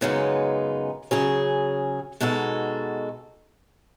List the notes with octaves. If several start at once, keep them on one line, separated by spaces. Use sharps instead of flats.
F#2 C#3 G#3 B3 D#4
C#3 F#3 C#4 G#4
B2 G#3 D#4 F#4 A4